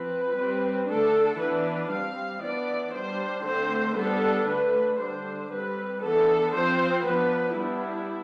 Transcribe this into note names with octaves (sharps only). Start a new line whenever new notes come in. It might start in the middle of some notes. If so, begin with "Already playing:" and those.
Already playing: F3 C4 B4
G3 C4
D3 A3 D4 A4
E3 B3 D4 B4
G3 C4 F5
E3 B3 D4 D5
G3 D4 C5
D3 A3 C4 C5
G3 B3 D4 A4
D3 A3 D4 B4
D3 G3 D4 C5
G3 C4 B4
E3 B3 D4 A4
F3 C4 C5
F3 B3 D4 B4
G3 B3 D4 E4